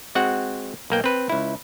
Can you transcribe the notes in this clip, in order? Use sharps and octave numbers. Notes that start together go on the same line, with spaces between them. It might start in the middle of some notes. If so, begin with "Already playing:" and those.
G#3 C4 F#4 F#5
B1 A#3 G5
C4 B4
C#2 E4